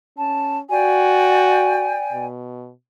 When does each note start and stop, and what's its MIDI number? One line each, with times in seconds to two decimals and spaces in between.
0.17 0.62 61
0.17 0.58 81
0.71 1.98 66
0.71 2.26 74
0.71 2.26 79
0.71 2.26 80
2.13 2.71 47